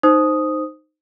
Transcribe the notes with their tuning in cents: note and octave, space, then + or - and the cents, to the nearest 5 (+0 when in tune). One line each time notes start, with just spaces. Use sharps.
D#4 -10 C5 +0 D#6 +0